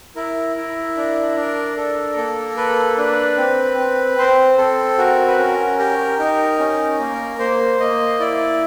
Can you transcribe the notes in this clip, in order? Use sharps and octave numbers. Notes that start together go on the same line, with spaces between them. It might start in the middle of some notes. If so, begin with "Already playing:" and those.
E4 A#4
E4
D4
D4
A4
A#3
A4 B4
D4 B4
C4
C4
C4 C5
C4 A4
F#4 A#4
B4
C#4 A#4
G4 A#4
D#4 A#4
C#4
A#3
A#3 C5
A#3 D#5
E4 D5